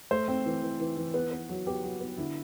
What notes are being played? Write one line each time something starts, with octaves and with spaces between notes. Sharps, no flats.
A3 C5
C4
E3
E3
E3
E3
B3 B4
B3
F#3
B3 G4
F#3
B3
D3 E4